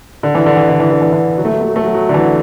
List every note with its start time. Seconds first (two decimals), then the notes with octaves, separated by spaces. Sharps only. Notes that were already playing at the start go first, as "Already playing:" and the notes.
0.23 D3
0.35 E3
0.46 D3
0.57 E3
0.69 D3
0.80 E3
0.91 D3
1.02 E3
1.13 D3
1.38 F#3
1.45 A3
1.53 F#3
1.61 A3
1.68 F#3
1.76 A3
1.84 F#3
1.94 F#3
2.09 D3
2.14 E3